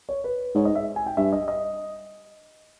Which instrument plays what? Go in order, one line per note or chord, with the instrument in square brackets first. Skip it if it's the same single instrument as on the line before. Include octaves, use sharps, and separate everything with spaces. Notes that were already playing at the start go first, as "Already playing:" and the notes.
[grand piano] C#5
B4
[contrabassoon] G#2 [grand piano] C#5
[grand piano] D#5
E5
G#5
G5
[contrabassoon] G2 [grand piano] E5
[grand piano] D#5
D#5